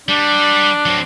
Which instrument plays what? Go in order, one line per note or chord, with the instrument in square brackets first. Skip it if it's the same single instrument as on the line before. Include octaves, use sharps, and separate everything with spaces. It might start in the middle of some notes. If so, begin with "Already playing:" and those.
[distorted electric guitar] G3 [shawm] D4
[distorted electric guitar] F#3 C4